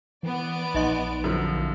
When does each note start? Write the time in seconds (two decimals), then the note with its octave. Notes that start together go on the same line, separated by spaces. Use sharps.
0.23 E3 B3 D5 D7
0.74 A#1 D#4 D#5 C6
1.24 F#2 D3 F3